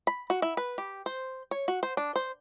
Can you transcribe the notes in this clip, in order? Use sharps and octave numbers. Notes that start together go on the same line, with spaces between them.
B5
F#4
E4
B4
G4
C5
C#5
F#4
C5
D4
C5